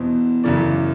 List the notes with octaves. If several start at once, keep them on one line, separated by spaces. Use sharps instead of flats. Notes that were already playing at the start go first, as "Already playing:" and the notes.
Already playing: E2 B2 C5
F#2 C#3 E3 D5